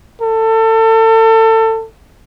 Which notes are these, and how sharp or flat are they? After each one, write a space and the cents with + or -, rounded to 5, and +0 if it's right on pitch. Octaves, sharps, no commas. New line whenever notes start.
A4 +30